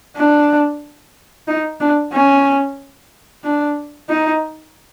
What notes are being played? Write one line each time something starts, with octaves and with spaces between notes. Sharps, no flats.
D4
D#4
D4
C#4
D4
D#4